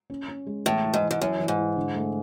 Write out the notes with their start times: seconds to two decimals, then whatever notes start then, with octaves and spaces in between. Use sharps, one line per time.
0.10 C#4
0.28 C#4
0.47 G#3
0.65 A2 E3
0.84 E4
0.94 G#2
1.02 E3
1.11 G#2
1.21 F#2 E3
1.40 E3
1.48 G#2
1.58 E4
1.77 D3
1.95 A3